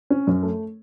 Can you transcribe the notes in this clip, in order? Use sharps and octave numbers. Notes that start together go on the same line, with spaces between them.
C#4
F#2
A3